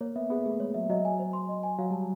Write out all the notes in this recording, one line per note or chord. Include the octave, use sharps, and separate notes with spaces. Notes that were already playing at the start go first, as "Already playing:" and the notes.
A#3 C#5
B3 E5
B3 G#4
A3 G#4
G#3 C#5
F#3 E5
F#3 D#5
G#5
C5
C6
D#5
G#5
F#3 F5
G3 A5